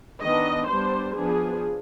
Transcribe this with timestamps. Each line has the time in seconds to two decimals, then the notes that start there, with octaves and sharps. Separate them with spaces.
0.21 D#3 B3 D4 D#5
0.68 G3 B3 D4 C5
1.15 F3 B3 D4 G#4